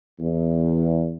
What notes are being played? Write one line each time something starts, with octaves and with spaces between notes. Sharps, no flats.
E2